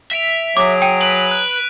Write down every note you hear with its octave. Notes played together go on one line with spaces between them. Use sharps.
E5 B6 D7 F7
F#3 G#4 D6
G5 D7 D#7
B4 D7
F#6